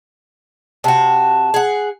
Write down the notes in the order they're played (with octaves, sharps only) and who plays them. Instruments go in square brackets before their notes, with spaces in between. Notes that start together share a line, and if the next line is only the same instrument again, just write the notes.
[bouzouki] C3 F#4 [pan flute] A5
[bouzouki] G#4 F#5